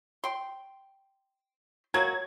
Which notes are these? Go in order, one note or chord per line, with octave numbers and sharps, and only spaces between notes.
G5 C6
F#3 A#3 F#4 G#6